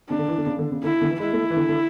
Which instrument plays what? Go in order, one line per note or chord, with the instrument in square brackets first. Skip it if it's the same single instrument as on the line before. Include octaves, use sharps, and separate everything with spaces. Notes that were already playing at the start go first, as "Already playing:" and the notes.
[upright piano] C#3 [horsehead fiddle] D4
[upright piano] D3
E3
D3
C#3
D3
C#3
[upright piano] D3 [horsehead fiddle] E4
[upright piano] D3
E3
[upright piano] G#3 [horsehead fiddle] E4
[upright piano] A3
E3
D3
D3